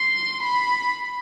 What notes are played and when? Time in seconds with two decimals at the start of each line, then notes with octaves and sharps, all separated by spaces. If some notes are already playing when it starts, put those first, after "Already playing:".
Already playing: C6
0.42 B5